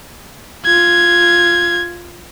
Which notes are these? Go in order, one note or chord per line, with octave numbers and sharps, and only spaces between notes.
F4 G#6